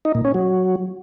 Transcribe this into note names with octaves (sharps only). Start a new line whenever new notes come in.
D#4
A#2
C#4
F#3